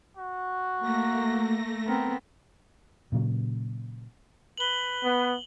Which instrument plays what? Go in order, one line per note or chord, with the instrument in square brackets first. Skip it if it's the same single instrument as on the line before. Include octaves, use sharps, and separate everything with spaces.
[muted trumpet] F#4
[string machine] A3 A#6 [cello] A#3
[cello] B3 C4 [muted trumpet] A#4
[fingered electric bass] A#2 C#3 F#3
[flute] B4 [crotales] F#7 G7
[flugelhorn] B3